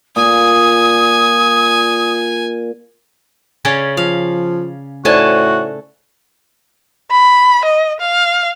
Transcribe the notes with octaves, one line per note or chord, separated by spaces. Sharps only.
A#2 G#5 D#6
C#3 C#4 D5
F3 F5
A2 A3 D#4 F#4 C5 D5 G#5 A5
B5
D#5
F5